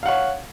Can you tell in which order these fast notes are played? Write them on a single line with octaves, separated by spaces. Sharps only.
F5 F#5 C#5